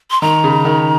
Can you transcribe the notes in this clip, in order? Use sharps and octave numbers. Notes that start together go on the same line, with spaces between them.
C6
D#3 A#5
C#3
D#3